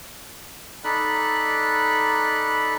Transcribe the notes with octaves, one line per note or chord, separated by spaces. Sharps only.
D#4 A4 D5 B5 F#6